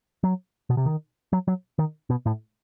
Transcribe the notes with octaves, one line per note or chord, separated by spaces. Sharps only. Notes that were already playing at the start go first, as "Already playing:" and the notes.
F#3
B2
C3
D#3
F#3
F#3
D#3
B2
A2